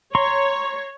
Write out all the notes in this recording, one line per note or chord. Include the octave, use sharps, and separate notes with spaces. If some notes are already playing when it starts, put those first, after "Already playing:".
C#5 A#5 C6 C#6